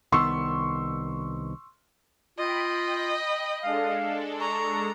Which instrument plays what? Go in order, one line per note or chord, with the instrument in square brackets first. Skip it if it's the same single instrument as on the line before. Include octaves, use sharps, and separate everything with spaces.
[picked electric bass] C2 D#3 B3 [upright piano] C6 C#6 E6
[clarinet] F4 [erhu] D#5 [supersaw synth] G5 B5
[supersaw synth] G#3 D4 A4 [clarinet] F5
[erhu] A#5 [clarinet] C#6